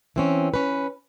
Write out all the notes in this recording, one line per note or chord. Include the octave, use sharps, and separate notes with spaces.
E3 C4 C#4
C#4 B4